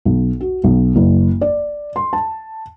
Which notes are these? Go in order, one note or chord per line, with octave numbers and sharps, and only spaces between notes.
B1
F#4
B1
F#1
D5
C6
A5